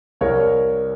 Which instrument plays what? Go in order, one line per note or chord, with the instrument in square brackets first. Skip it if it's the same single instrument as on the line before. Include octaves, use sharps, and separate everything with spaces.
[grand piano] C2 A#4 C#5